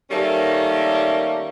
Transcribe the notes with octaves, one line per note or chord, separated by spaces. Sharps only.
D#3 G3 A3 A#3 C#4